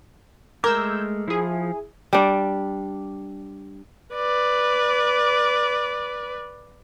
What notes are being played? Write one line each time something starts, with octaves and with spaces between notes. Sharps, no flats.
G#3 A3 A#4 D6 E6 G6 G#6
F3 E4 G#4
G3 D4
B4 D5